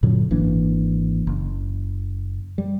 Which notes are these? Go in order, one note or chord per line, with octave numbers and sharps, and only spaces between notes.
F#2 A#2 D3 F#3
G#1 E3 A#3 D4
F#1
G3